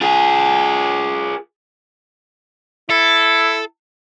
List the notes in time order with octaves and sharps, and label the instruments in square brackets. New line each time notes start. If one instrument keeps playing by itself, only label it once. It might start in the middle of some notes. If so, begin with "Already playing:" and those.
[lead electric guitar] F4 G#4
[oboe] E4 [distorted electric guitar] A4